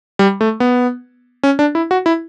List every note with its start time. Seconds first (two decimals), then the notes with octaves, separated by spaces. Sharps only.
0.19 G3
0.41 A3
0.60 B3
1.43 C#4
1.59 D4
1.75 E4
1.91 F#4
2.06 E4